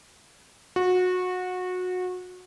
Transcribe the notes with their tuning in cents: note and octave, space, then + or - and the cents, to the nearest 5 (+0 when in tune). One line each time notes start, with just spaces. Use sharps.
F#4 -25